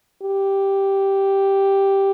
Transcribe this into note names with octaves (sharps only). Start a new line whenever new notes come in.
G4